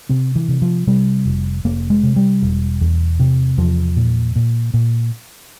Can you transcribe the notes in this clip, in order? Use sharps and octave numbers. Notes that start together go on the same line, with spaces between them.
C3 C4
E3
C3
F3
C3 G3
F1
F1 A#3
G#3
C3
G3
E1
E2
C3
E2 F3
A#2
A#2
A#2